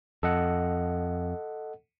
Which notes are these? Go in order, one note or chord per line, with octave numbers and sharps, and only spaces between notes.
F2 A4 D#5 F#5